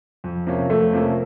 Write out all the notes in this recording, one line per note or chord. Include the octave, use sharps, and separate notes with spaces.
F2
C3 F3 A#3 C#4
F2 A3
C3 F3 A#3 C#4